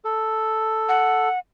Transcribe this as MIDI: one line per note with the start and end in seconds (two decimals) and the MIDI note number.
0.05 1.29 69
0.89 1.39 78